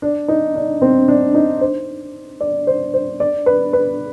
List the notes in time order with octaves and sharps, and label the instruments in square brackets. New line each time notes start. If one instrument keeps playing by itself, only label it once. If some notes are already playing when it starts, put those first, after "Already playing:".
[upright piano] D4
D#4
D4
C4
D4
D#4
C5
D5
C5
C5
D5
B4
B4